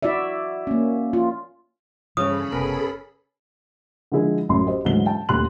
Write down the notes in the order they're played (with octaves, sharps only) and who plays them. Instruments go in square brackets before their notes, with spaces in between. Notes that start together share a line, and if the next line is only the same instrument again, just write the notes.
[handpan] E4 F#4 D5 E5
A#3 C#4
F4
[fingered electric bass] G2 E3 [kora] C#3 C#4 [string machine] G#4 A4 B5 [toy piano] D#6
[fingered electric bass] F#1 C3 B3 [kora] A#4 B4
[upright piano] D3 F3 G#3 E4 G#4
A1 F#2 C6
G4 C5 D#5
D2 G#2 E3 F#3 G7
G5 A5
D#1 D2 G4 C6 F#6 F#7